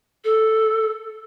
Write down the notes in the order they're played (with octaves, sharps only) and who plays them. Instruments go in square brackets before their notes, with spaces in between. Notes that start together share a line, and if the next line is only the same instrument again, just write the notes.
[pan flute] A4